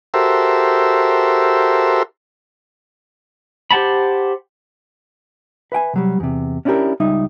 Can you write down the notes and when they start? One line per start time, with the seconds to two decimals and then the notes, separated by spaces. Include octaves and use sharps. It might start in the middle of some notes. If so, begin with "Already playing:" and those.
0.14 F#4 G4 A4 A#4 C5 E5
3.71 G4 C5 F#5 A5 B5
5.72 B4 E5 G5 G#5
5.94 C3 F#3 G3
6.20 E2 C3
6.65 C#4 D4 E4 F4 G4 A#4
7.00 C#2 G3 D#4 E5